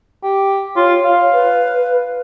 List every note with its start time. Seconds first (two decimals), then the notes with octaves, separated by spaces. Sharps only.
0.23 G4
0.76 F4 C#5
1.04 F5
1.33 B4